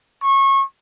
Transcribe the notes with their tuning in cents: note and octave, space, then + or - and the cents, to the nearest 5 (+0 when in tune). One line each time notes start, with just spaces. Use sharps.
C#6 -25